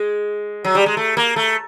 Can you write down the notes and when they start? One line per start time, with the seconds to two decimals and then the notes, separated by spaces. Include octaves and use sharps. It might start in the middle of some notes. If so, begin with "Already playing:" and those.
Already playing: G#3
0.65 F#3
0.75 G3
0.86 G#3
0.97 A3
1.17 A#3
1.36 A3